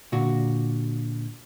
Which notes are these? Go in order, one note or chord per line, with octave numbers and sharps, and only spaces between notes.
A#2 D3 F#4